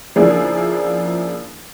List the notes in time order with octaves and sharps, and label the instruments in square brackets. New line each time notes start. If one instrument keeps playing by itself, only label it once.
[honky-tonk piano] C#3 F3 A#3 D4 E4 G#4